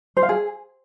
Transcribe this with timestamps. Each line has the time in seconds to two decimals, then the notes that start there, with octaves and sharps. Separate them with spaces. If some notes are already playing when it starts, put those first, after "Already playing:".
0.17 C5
0.23 F5
0.29 G#4